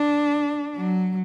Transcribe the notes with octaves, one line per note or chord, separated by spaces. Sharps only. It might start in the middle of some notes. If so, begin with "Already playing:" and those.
Already playing: D4
F#3